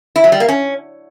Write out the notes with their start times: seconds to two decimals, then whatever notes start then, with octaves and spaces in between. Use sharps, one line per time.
0.16 E4
0.24 F#3
0.32 G3
0.40 A#3
0.48 C#4